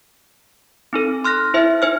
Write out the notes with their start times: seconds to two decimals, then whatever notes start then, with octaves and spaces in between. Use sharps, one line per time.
0.93 C4 D#4 A4
1.24 C6 F6 F#6 A#6
1.54 E4 C5 E5
1.82 D#4 C5 F6